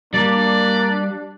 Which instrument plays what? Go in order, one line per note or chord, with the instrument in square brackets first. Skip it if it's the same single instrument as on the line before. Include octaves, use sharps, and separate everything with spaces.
[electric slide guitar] G3 [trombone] A#3 [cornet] D4 [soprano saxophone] D5